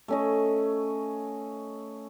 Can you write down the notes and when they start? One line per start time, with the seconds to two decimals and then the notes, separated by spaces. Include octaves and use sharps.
0.08 A3 C#4 D#5